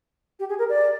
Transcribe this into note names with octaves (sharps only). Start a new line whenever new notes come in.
G4
G#4
A#4
D5